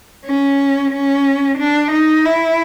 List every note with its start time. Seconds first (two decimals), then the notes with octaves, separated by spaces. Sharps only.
0.25 C#4
0.92 C#4
1.58 D4
1.92 D#4
2.25 E4